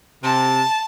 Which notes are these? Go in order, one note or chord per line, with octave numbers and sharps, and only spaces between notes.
C3 A5